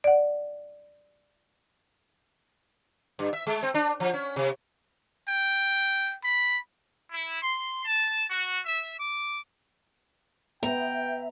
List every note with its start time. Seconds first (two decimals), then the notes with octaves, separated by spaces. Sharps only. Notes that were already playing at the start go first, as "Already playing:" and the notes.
0.04 D5 F#5
3.19 G2
3.33 E5
3.47 G#3
3.63 C4
3.74 D4
4.00 F3
4.14 C#4
4.36 C3
5.28 G5
6.24 B5
7.11 E4
7.41 C6
7.86 A5
8.30 F#4
8.65 E5
8.98 D6
10.63 B3 E5 G5 A#5